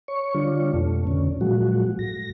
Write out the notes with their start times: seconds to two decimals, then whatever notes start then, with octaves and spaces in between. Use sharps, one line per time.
0.08 C#5 C#6
0.34 D3 G3 D4 F4 C#5
0.74 F2 B2 A3
1.07 F2 D3 C#4
1.41 A#2 F3 F#3 G#3 F#4
1.99 A2 A#6